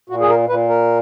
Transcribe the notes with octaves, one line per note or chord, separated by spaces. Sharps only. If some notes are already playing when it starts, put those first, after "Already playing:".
A#2 F#4
G#4
A#4
A#2 B4
A#4